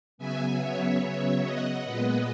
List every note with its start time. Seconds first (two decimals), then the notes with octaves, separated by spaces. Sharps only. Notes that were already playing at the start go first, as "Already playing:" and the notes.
0.18 C#3 F#3 B3 E5 G#5
0.60 C#5 E5
1.02 C#5 E5
1.43 D#5 F#5
1.84 A#2 G#3 B3 B4 D#5